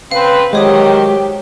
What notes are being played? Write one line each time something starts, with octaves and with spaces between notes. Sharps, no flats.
C#3 C4 B4 F5
D#3 F#3 G#3 G4 C5 C#5 D#6